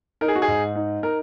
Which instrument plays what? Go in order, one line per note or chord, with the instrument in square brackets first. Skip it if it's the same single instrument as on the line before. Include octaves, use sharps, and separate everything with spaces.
[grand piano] D#4 A#4
G#4
F#4
G#4
G#2
D#4
D#4 A#4